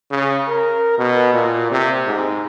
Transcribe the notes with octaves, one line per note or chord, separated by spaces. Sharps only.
C#3
A#4
B2
A#2
C3
G#2